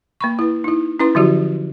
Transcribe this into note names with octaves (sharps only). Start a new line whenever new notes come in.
A#3 B5 C#6
E4 B4
D#4 E4
C#4 E4 B4 C6
D3 F3 F#3 E4 F#4 G4